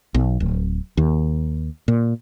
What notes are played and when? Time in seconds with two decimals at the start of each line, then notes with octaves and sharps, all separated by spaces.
0.15 B1
0.40 D1
0.97 D#2
1.88 A#2